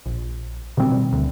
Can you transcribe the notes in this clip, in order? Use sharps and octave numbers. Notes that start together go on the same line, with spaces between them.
A#1
B2 D#3 G3 C4
D2